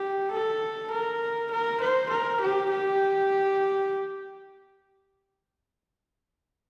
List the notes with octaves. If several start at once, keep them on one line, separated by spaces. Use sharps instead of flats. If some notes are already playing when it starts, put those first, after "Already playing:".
Already playing: G4
A4
A#4
A#4
C5
A#4
G4
G4